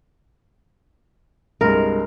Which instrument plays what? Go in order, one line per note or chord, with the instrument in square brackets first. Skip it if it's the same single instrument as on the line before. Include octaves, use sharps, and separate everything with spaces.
[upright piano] C2 G2 G#3 [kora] A#4